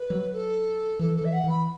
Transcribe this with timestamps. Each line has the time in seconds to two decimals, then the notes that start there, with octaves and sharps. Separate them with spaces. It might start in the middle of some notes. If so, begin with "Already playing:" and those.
Already playing: B4
0.10 F#3
0.33 A4
0.99 E3 A4
1.16 A4
1.21 E3 E5
1.33 F#5
1.44 E3
1.49 B5